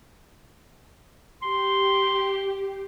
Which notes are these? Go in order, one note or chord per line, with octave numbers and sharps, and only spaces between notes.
G4 C6